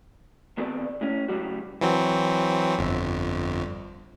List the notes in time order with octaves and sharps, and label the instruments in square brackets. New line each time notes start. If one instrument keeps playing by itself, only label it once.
[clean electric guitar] D#3 B3 C4 A4 B4 D5
A2 C#4
A2 C#3 F#3 G3 F#4
[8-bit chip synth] E3 F#3 C4
G1 F2